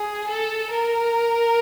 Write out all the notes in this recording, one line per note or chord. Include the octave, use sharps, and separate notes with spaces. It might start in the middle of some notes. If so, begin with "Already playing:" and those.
Already playing: G#4
A4
A#4